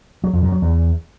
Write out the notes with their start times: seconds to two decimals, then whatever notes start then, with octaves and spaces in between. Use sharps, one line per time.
0.24 F#3
0.33 F2
0.43 F#2
0.52 F#3
0.62 E2